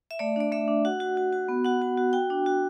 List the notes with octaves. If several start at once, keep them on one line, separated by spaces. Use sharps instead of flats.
E5
A3 D5
D4 D5
A3 E5
D4
F#4 F#5
F#4
F#4
F#4
B3
F#4 F#5
F#4
F#4
F#4 G5
D4
F#4